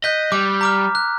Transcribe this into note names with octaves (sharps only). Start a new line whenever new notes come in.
D#5 F#6 G6 B6
G3 D6
A#5 D6 F6
F#6